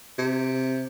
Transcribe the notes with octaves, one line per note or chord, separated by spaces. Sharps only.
C3